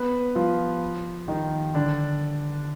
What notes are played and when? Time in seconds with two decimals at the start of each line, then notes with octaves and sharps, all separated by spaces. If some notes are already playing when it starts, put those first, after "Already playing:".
Already playing: B3 B4
0.35 F3 F4
1.28 D#3 D#4
1.74 D3 D4